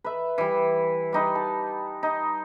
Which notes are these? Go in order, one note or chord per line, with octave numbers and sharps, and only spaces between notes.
B4 E5
E3 G3
G3 D#4 B4
A5
D#4